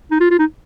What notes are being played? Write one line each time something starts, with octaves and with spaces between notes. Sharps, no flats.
D#4
F4
F4
D#4